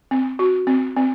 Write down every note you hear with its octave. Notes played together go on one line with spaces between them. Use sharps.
C4
F#4
C4
C4